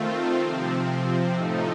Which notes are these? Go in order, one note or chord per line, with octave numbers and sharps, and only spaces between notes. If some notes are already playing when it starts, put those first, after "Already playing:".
Already playing: D#3 A3 C4 F4
C3 F3 C4
A2 F3 A3 D#4